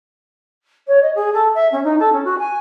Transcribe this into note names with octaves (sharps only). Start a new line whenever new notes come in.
C#5
D#5
G#4
A4
E5
C#4
D#4
A4
C#4
F#4
G#5